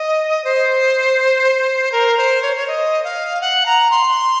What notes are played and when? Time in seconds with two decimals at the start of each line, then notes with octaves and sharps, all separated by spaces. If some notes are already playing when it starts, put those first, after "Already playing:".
Already playing: D#5
0.44 C5
1.92 A#4
2.17 C5
2.42 C#5
2.56 C#5
2.67 D#5
3.04 F5
3.41 F#5
3.66 A#5
3.91 C6